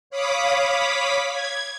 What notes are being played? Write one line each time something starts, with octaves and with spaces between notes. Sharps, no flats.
C#5 F5 B5 D6 D#6 B6
G#6